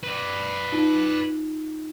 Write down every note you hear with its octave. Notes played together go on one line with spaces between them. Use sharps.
B4 D5
D#4 F4